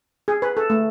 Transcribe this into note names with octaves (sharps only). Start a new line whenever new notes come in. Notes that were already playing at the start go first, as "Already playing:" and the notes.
G#4
B4
A4
A3